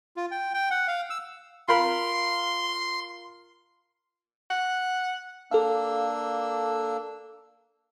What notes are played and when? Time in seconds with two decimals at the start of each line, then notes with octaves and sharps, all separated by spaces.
0.17 F4
0.31 G5
0.54 G5
0.71 F#5
0.88 F5
1.10 E6
1.68 F4 A#4 B5 C6
4.50 F#5
5.51 A#3 D4 A4 F5 E6